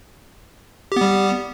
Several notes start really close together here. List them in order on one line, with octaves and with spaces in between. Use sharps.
G4 B3 G3